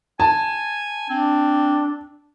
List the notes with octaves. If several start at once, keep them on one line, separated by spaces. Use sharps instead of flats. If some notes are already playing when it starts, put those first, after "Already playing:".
G#5 A5
C4 D4